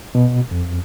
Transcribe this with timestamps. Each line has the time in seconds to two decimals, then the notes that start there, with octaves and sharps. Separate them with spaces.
0.15 B2
0.51 F2